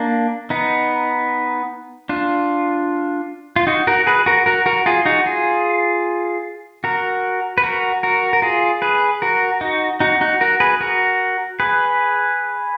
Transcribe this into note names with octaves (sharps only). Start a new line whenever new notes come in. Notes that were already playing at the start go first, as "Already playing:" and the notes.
Already playing: A#3 D4
B3 D#4
D4 F4
F4
D#4 F#4
F#4 A#4
G#4 B4
F#4 A#4
F#4 A#4
F#4 A#4
F4 G#4
D#4 F#4
F4 G#4
F#4 A#4
B4
F#4 A#4
F#4 A#4
A#4
F4 G#4
G#4 B4
F#4 A#4
D#4 F#4
D#4 F#4
D#4 F#4
F#4 A#4
G#4 B4
F#4 A#4
G#4 B4